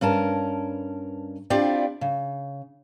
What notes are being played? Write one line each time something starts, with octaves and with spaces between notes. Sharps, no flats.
G2 C#4 A#4 A5
C4 D4 E4 F4 G4 D5
C#3